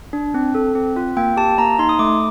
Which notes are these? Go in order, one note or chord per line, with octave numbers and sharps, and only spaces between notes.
D4
C4
A4
C4
F4
A#3 G5
G4 A5
A#3 A#5
D#4 C6
D#6
A3 D6